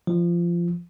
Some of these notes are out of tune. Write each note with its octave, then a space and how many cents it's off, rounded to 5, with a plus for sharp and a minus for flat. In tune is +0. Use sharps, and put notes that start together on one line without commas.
F3 -20